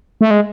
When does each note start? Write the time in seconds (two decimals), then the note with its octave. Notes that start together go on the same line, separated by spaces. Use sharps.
0.21 A3
0.31 G#3